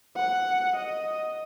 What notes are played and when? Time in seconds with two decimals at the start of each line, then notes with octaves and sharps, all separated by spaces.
0.16 F#5
0.75 D#5